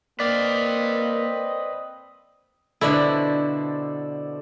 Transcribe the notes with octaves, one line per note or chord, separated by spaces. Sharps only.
A#3 C4 B4 D5 D#5 F5
B2 D3 E4 A4 C5 D5